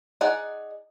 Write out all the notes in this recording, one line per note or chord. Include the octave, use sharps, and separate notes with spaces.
D#4 G#4 D5 F#5